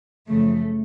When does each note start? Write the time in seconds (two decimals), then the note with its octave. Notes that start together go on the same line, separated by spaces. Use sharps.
0.28 F#2 C#3 F3 A3